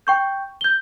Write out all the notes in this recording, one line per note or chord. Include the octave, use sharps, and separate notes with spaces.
G5 C#6 G6
G6 G7